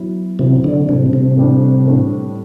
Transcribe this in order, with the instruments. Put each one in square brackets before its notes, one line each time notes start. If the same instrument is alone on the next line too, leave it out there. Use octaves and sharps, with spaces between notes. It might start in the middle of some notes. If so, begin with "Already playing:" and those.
Already playing: [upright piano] F#3 B3 E4
[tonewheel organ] C3 [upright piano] F#3 B3 E4
[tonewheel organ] D3
[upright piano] A2 G3 D4 [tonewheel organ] C3
[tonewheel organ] C3
[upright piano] A2 G3 D4
A2 G3 D4